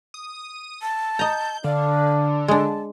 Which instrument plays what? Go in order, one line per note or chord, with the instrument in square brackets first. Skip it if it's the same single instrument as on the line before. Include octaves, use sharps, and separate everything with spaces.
[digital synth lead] D#6
[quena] A5
[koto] D#5 A#5 [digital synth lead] G6
[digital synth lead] D3 [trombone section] D4 [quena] F5
[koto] G#3 D4 [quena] A5